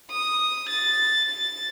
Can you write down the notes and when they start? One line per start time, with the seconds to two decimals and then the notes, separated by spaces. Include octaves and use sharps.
0.11 D#6
0.70 A6
1.29 A6